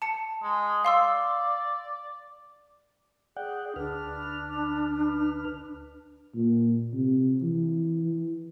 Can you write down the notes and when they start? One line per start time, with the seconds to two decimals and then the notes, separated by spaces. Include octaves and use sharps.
0.02 A5 C#7
0.43 G#3
0.85 D5 F5 C6 E6
3.37 G#4 D5 F#5 G5
3.76 D2 D4 B4 F6
6.35 A#2
6.93 C3
7.43 E3